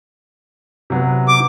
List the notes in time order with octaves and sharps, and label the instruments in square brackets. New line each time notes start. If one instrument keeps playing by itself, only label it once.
[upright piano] C3 F#3 B3
[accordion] D6